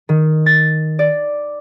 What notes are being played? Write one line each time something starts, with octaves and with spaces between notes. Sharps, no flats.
D#3
A6
D5